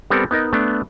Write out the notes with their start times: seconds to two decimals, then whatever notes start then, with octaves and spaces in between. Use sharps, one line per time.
0.10 G3 B3 C4 A4 A#4
0.31 B3 D#4 A#4 D#5
0.53 A3 B3 D4